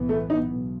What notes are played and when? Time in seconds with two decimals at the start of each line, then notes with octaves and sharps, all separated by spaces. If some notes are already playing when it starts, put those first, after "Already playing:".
Already playing: B1 A2 E3 B3
0.09 A3
0.30 D#4
0.50 B1